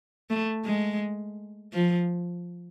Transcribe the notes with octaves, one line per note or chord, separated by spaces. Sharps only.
A3
G#3
F3